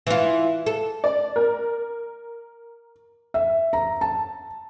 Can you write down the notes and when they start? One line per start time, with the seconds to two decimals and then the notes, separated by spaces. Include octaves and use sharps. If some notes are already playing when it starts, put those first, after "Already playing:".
0.07 E3 F4
0.66 A4
1.04 D5
1.36 A#4
3.34 E5
3.73 A#5
4.01 A5